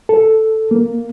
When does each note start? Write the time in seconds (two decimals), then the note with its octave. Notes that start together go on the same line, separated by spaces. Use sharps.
0.09 A4
0.71 A#3